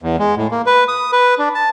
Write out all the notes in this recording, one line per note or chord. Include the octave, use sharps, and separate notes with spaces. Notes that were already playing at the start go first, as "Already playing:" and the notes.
E2
G#3
A2
A#3
B4
D#6
B4
D4
A5